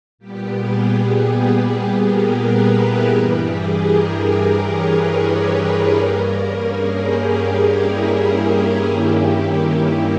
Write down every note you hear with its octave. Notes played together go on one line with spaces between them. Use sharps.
A#2 G3 B3 G4
G#4
G#4
G#4
G#4
A#4
B4
E4
G2 E3 G3 G4
G#4
A#4
C#5
B4
A#4
G2 G3 A#3 C#4
G#4
G4
G4
E4
E4
G4
G2 D#3 A#3 C#4 E4